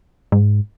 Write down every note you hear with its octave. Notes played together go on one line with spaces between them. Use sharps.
G#2